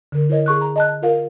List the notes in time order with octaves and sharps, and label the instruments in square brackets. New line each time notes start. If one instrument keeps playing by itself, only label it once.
[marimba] D3 A#4
E4 A#4 C5 C#5 D#5
G#4 C#6 F#6
A#5
D#5 A5 F#6
F4 A#4 F5